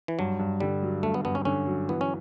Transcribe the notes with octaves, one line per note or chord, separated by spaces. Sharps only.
E3
G2 F#3
G2
D3 G3
F#3
G2 A3
B3
G2 B3
C#4
D3 C#4
F#3
E3 B3
C#4